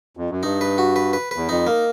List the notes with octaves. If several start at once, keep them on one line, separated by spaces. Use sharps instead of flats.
F2
F#2
G2 D#4
B4
F#4
B4
B4
E2 B4
F2 D#4
A#3